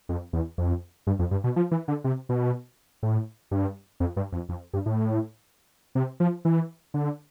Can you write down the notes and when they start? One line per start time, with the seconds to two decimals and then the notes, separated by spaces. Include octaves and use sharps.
0.09 F2
0.33 E2
0.58 F2
1.07 G2
1.19 F2
1.31 G2
1.44 B2
1.56 F3
1.71 E3
1.88 D3
2.04 C3
2.29 B2
3.03 A2
3.51 G2
4.00 F2
4.17 G2
4.33 F2
4.49 F2
4.73 G2
4.86 A2
5.95 C3
6.20 F3
6.45 E3
6.94 D3